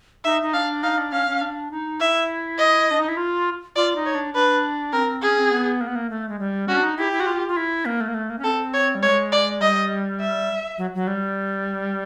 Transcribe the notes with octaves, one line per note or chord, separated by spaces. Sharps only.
D#4 E5
D#4
D4 F5
D#4 F5
D4
C#4 F5
C#4
D4
D#4
E4 E5
D#5
D4
D#4
E4
F4
F4 D5
D#4
C#5
D4
D4 B4
C4 A#4
C#4 G#4
C4
B3
A#3
B3
A#3
A3
G#3
G3
C#4 F#4
D4
D#4
E4 G4
E4
F#4
F4
F4
E4
A#3
A3
A#3
A3
A#3
C#4
C4 A4
C#5
G3
G#3 C#5
D5
G3 D#5
E5
F#3
F#3
G3